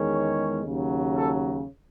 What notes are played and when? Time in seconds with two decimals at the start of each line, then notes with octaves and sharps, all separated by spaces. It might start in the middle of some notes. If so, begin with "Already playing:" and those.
Already playing: E2 D#3 G#3 C#4
0.14 C#5
0.64 D#2 C#3 F#3
1.15 A4